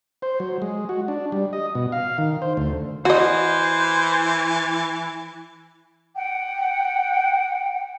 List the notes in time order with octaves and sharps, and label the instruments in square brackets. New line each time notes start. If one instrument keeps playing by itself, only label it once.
[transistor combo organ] C5
F#3
G#3
F#4
D4
G3
D#5
B2
F5
D#3
C5
D2
[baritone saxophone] E3 [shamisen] F#4 D#5 [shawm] C5
[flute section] F#5 G5